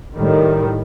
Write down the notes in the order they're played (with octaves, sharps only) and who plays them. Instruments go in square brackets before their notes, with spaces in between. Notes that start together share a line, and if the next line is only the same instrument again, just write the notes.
[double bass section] A2 D#3 G3